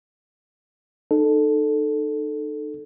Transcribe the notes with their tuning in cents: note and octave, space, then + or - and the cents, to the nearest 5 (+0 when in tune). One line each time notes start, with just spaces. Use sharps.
D#4 -35 A4 +0